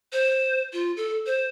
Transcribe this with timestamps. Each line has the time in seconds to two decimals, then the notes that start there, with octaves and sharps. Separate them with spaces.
0.13 C5
0.73 F4
0.97 A4
1.26 C5